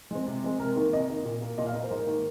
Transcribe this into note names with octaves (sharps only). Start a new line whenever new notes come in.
G#3 C4
C3
G#3 C4
C3 A#4
D#3 A#3
C3 D#5
D#3 A#3
A#2
A#3
A#2 D#5
F5
A#3 D#5
C5
G#2 A#4
D#3 A#3